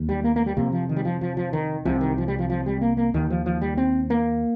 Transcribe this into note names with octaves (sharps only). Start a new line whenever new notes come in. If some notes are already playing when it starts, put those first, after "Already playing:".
Already playing: D#2
G3
A#3
A#3
G3
F2 C3 A#3
F3
D#3
G3
F3
F3
F3
D#3
C2 C3 F3
D#3
F3
G3
F3
F3
G3
A#3
A#3
D#2 D#3
F3
F3
G3
C4
A#3